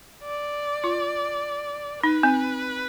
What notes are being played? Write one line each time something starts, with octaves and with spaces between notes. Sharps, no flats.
D5
F4
D#4 B4
C4